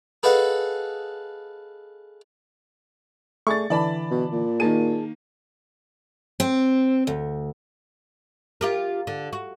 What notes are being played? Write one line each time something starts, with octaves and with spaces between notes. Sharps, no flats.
G#4 A4 B4 D#5 F5 F#5
A3 G#4 D5 C#6 A6
D3 E3 D5 A5 B5
B2
A#2
D#3 A#3 G#4 A5 D#7
C4
D2
F4 G4 A#4
D3
F#4